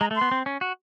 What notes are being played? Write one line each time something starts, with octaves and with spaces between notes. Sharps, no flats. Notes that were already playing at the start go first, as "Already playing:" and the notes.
G#3 A#5
A3
C6
B3
C4
C#4
F#4